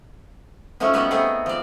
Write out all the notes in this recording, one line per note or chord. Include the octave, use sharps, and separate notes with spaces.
F3 F#3 A3 C#4 D#4
G3 B3 D#4 F#4 B4 C#5
A3 B3 C4 G#4
F3 D5